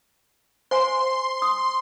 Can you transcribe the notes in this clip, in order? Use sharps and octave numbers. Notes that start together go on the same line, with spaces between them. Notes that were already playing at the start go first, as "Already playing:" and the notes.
C5 F5 G#5 C6
D#6